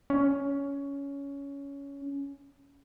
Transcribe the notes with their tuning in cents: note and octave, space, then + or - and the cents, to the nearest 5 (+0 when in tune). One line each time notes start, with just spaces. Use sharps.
C#4 +15